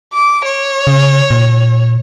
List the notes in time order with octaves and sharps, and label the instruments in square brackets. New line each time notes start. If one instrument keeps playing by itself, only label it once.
[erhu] D6
C#5
[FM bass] C#3
A#2